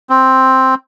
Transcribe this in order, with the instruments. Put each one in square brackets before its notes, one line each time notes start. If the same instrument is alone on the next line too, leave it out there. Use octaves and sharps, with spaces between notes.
[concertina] C4